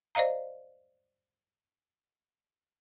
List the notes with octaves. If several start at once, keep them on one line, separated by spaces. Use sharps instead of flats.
C5 D5 D#5 F5 A#5